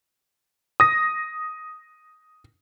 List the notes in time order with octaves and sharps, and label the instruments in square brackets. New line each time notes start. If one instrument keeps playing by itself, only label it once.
[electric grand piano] D#6 A#6